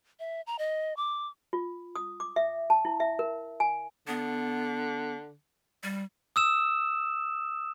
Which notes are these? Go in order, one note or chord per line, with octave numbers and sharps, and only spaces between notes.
E5
A#5
D#5
D6
F4
D#6
D6
E5
A5
E4
E5
A#4
G#5
D3 B3
G3
D#6 E6 E7